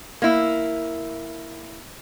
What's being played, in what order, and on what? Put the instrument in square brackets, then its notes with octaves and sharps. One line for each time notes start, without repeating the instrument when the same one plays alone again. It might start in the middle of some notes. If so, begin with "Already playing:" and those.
[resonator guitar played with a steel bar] A#3 E4